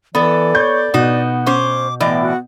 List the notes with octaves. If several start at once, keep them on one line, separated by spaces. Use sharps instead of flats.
E3 B3 A4 D5
C#5 G6
B2 B3 D#4 F#4
C#4 C5 D6
A2 E3 B3 D5 D#5
F#4